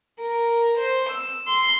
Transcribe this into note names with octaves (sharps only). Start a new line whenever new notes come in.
A#4
C5
E6
C6